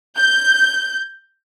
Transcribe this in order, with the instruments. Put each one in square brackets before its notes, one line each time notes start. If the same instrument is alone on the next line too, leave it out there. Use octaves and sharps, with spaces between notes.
[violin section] G6